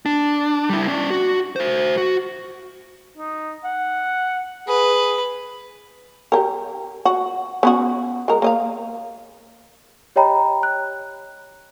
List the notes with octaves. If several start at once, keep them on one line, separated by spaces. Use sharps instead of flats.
D4
G3 E4
C#4 D5
F#4
F#4 C5
F#4
D#4
F#5
G#4 B4
G4 G#4 A#4
F#4
B3 C#4 F#4
G#3 A#4
A#3 D#5 F5
G4 C#5 D#5 G5 A#5 B5
F#6